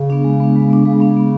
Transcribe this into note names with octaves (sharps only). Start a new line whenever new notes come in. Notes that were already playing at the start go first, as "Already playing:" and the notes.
Already playing: C#3
B3 D4
G#3
B3 D4
G#3
B3 D4
C#3 G#3
B3 D4
B3